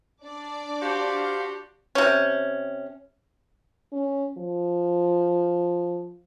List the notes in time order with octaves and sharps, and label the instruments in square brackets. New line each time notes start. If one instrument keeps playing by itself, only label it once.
[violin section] D4 D5
[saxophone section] F#4 G4 [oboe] C5 [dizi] F5
[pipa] C3 C#4
[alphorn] C#4
F3